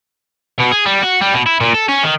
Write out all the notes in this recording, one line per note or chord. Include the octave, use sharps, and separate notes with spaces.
B2
G#4
G3
F#4
G3
B2
E4
A#2
A4
C#4
D#3